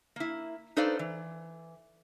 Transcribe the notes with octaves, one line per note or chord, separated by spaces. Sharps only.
A#3 E4
D#4 A4 B4 C5 D5 F5
E3